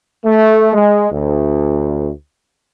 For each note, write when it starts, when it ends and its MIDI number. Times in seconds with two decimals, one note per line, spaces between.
0.24 0.73 57
0.73 1.07 56
1.10 2.10 38